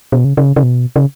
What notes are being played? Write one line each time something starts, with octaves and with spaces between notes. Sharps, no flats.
B2
C#3
C#3
C#3
B2
C#3